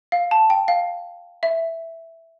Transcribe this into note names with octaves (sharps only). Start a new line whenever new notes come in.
F5
A5
G5
F5
E5